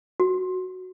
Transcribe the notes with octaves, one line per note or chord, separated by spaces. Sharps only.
F#4